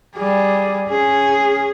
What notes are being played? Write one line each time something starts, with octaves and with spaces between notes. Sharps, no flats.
G3 G#4
C#4 G#4